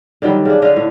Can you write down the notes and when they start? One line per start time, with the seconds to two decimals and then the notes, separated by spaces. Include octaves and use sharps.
0.22 D3 D#3 F#3 G3
0.45 C#3 D4
0.62 D3 D4 D#5 F5
0.76 A2